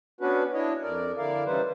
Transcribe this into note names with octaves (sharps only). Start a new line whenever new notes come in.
B3 C#4 D4 F#4 B4
D4 E4 C#5 D#5
F2 A#4 D5
D3 E4 A#4 D5 F5
C#3 E3 G3 D#4 B4 C5